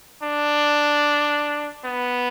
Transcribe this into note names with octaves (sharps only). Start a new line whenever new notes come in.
D4
B3